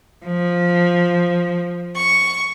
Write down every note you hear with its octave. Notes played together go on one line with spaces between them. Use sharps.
F3
C#6